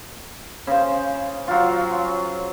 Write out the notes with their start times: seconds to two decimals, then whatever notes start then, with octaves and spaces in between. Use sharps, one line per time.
0.67 C#3 C5
1.48 F#3 F4